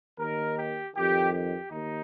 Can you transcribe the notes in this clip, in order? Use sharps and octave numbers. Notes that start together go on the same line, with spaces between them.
D#2 D#3 A#4
G4
F2 D#3 G4
G4
D#2 D#4